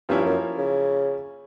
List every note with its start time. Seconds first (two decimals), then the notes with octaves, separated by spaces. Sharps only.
0.09 G2 F3 A#3 C#4 E4
0.25 F#2
0.58 C#3